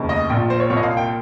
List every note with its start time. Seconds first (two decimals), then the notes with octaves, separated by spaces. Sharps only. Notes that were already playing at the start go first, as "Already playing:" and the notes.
Already playing: F1 D#2 C#3
0.09 D#5
0.30 A#1 A#2 G5
0.50 C5
0.60 C#5
0.70 C2 A#2 C#5
0.77 D#5
0.83 F5
0.97 G5